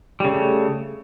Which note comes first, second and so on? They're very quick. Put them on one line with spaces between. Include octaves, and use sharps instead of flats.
G3 C#3 A3